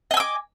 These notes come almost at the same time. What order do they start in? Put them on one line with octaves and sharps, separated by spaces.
D#5 G#5 E6 D6